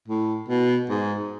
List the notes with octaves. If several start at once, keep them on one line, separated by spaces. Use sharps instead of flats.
A2
B2
G#2